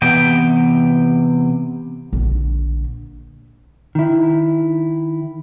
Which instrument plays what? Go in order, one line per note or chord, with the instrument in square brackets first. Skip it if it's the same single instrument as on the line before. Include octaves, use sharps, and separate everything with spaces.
[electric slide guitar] C3 E3 B3 G5
[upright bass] A#1 D3
[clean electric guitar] D#3 E4